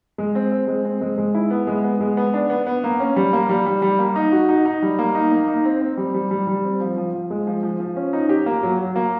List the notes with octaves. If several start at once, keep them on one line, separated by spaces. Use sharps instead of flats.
G#3
C4
C4
G#3
C4
G#3
G#3
E4
B3
G#3
B3
G#3
B3
D4
B3
B3
A#3
C#4
G3
A#3
G3
G3
G3
A#3
D#4
F#4
D#4
D#4
G3
A#3
D#4
A#3
D#4
C4
C4
G3
G3
G3
G3
C4
F3
F3
F3
G#3
F3
F3
F3
C#4
D#4
G4
A#3
F#3
F#3
A#3